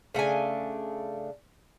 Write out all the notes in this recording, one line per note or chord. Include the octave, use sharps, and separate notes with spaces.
C#3 A3 D4 G#5